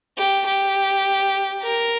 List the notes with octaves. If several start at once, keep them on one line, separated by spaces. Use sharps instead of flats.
G4
G4
A#4